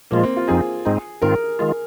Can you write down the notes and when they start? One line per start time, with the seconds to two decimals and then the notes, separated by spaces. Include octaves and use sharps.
0.11 A#2 F3 G#3 A#3 F4
0.23 C4
0.37 F4
0.48 F2 F3 C4 D#4 G#4
0.85 G#2 G#3 C4 D#4
1.22 G#2 D#3 C4 F4 A#4
1.59 D#3 G#3 F4